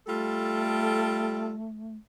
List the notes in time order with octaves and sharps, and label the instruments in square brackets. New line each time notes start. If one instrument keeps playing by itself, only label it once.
[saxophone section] G3 F4 A4 [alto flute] A3